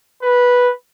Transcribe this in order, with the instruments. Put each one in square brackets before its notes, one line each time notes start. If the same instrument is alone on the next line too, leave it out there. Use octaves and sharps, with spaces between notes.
[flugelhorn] B4